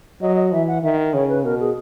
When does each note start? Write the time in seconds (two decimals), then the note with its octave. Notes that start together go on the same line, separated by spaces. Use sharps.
0.21 F#3 D#5
0.36 D#5
0.52 E3 E5
0.68 F#5
0.83 D#3 E5
1.13 C#3 C#5
1.29 B4
1.44 B2 A#4
1.60 G#4